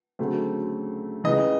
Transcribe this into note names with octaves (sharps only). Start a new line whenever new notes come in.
D2 C#3 F#3 A3 C4
C#2 C#3 E3 D#5